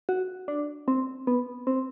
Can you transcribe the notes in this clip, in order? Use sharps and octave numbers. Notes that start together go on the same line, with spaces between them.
F#4
D4
C4
B3
C4